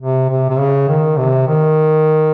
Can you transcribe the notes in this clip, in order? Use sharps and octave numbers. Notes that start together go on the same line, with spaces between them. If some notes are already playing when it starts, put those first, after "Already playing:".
C3
C3
C3
C#3
D#3
C3
D#3